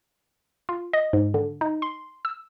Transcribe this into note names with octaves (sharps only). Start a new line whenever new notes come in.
F4
D#5
G#2
D3
D#4
C6
E6